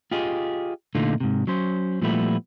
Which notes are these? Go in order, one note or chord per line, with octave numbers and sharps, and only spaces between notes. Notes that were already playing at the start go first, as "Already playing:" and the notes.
F4 G4 G#4 D#5
A#2 D3 A3 D#4 F4
G#2 C3
F#3 C#4 C5
A#2 F3 G3 A3 B3 E4